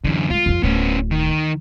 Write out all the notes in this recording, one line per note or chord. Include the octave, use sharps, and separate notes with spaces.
F#2 D3 E3
D3 G#3 F4
F2 F3
D1 B3 C#4
D#3